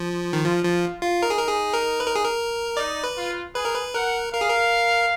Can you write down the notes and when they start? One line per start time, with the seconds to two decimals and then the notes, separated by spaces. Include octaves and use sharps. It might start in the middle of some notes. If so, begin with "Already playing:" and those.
Already playing: F3
0.33 D#3
0.44 F3 F4
0.64 F3
1.02 F4
1.22 D#4 A#4
1.30 G#4
1.38 A#4
1.48 G#4
1.73 A#4
2.00 B4
2.07 A#4
2.15 G#4
2.24 A#4
2.77 D#4 D5
3.04 B4
3.16 F4
3.54 G#4 B4
3.65 A#4
3.74 B4
3.94 A#4 F#5
4.32 A#4 F5
4.41 G#4
4.49 A#4